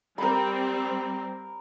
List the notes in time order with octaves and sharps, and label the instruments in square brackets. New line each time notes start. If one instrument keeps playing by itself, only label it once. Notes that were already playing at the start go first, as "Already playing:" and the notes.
[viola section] G3 C4 [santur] A#4 B5